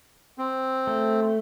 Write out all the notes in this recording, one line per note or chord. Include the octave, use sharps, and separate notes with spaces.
C4
A3